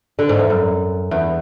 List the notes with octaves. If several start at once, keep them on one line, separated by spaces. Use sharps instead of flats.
D3
G#2
E2
F#2
E2